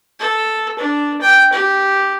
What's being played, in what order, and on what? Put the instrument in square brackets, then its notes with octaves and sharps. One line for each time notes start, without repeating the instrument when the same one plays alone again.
[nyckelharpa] A4
D4
G5
G4